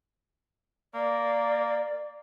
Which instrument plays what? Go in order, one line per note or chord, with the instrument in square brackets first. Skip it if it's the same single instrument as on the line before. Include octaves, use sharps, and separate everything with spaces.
[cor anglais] A#3 [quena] D5